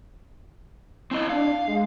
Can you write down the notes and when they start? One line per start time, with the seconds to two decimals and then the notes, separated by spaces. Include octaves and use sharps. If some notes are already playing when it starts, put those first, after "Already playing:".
1.11 C4 E4 D#5
1.30 D4 F5
1.68 G#3